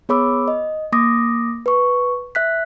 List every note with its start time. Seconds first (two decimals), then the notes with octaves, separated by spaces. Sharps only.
0.09 B3 G#4 C#5 B5 D6 E6
0.48 D#5
0.92 A#3 D6 D#6 A#6
1.66 B4 C#6
2.35 E5 F#6 B6